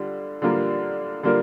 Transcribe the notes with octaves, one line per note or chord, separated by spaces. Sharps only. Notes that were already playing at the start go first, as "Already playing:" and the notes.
Already playing: D3 G3 F4
D3 G3 A#3 F4 A#4
D3 G3 A#3 F4 A#4